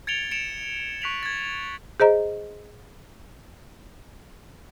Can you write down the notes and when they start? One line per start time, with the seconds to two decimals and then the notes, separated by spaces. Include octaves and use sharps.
0.07 G#6 A6 C#7 D7 F7 G7
0.31 C#7 D7 E7 F7
1.01 C#6 F#6 B6 D7 F7 F#7
1.23 G#6 A6
2.00 G#4 C5 D#5 A#5